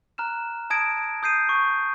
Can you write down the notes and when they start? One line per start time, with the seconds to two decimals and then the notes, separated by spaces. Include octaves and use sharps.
0.18 A#5 F6 F#6 E7
0.70 A5 D#6 G#6 A#6 D7
1.23 D#6 G6 C7 D#7
1.49 C#6